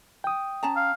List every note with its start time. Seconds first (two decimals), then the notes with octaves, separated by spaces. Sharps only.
0.24 G5 D#6
0.63 C#4 A5 A#5
0.76 F5